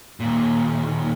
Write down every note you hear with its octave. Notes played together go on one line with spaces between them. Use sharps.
D#2 A#2